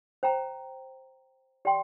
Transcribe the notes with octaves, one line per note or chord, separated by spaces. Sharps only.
C5 G5 A#5
G4 D5 G5 C6